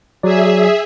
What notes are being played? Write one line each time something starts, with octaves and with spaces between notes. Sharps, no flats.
F#3 G#4 D5 E5